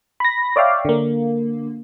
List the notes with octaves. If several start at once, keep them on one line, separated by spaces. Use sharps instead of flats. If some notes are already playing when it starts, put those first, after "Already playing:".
B5 A#6
C#5 D5 E5 F5 G5
D3 A#3